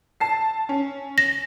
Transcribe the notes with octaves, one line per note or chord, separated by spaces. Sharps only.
A5 C7
C#4
A#6